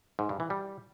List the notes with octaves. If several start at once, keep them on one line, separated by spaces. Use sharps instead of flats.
G#2
G2
E3
G3